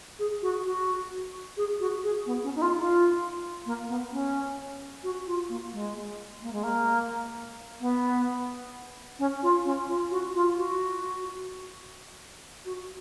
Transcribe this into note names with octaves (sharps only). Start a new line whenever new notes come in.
G#4
F#4
F#4
G#4
F#4
G#4
B3
C#4
D#4
F4
F4
A#3
B3
C#4
F#4
F4
A#3
G#3
A#3
G#3
A#3
B3
C#4
F4
C#4
F4
F#4
F4
F#4
F#4